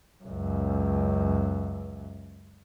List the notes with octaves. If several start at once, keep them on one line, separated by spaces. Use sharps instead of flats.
C#2 F#2